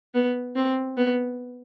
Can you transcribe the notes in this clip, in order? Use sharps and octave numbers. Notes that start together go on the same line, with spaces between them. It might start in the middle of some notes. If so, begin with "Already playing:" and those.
B3
C4
B3